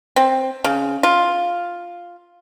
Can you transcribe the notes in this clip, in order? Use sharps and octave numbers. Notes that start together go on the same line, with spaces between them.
C4
C#3
F4